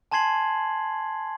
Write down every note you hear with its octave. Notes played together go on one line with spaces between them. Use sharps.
G#5 A5 C6 G#6 C7 F#7